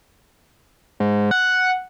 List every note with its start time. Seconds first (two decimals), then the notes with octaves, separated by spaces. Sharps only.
1.00 G#2
1.31 F#5